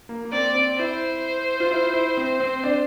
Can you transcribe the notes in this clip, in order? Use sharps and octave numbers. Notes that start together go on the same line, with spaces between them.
A#3
A#3
C4 D5
C4
E4 C5
F4
E4
E4
C4
C4
D4